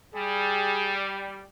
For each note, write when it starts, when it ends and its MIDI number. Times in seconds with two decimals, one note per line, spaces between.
0.15 1.44 55
0.15 0.99 68